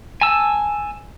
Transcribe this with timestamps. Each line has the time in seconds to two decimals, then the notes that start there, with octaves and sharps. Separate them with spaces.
0.21 G#5 A5 E6